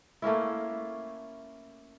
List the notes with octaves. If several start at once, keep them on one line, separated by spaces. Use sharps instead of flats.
A3 A#3 C#4 E4